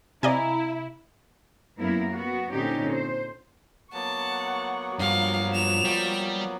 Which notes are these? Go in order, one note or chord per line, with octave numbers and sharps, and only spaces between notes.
C3 E4 D5 D#5 F5 G#5 A#5
F#2 A#3 B3 E4 A#4
B3 F#4
A#2 D3 C4 C#4 D#4 G4
C5
F#3 A#3 B3 F#5 A5 C#6
G2 F3 F#4 F5
E7 F7
G3